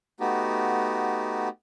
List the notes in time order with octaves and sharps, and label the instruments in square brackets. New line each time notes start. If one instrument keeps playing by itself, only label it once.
[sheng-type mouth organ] A3 B3 D#4 F#4 G4